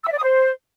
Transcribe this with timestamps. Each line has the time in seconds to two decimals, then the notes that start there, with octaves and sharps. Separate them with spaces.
0.02 E6
0.07 E5
0.12 D5
0.17 D#6
0.23 C5